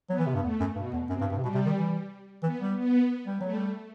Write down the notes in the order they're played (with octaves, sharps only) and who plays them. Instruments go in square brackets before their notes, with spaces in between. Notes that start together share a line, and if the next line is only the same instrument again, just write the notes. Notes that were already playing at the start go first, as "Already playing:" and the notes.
[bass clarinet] F#3 [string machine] B3
[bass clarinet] E3
C3
G2
[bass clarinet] E2 [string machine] A3
[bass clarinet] F#2
[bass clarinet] G2 [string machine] B2
[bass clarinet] E2
[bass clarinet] F#2 [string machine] C3
[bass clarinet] G2
G2
C3
[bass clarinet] B2 [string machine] G3
[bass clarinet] C3
D#3
E3
[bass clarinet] E3 [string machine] B3
[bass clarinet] G3
[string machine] B3
[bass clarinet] G3
[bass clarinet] F#3 [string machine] A3
[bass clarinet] G3